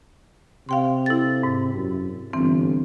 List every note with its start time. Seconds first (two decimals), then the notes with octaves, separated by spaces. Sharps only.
0.69 C3 F5 G5 C6
1.06 E4 A4 A6
1.43 G#2
1.73 F#2
2.33 G1 E3 C4